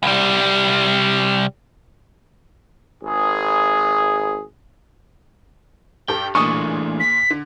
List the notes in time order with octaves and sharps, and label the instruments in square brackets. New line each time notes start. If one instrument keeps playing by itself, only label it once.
[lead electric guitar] C2 G3
[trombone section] G#1 G#4
[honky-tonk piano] G2 G4 A4 [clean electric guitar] G5
[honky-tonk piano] A#2 G#4 D#7 [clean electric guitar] E3 A3 D4 [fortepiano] C#6 D#6
[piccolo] B6
[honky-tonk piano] D3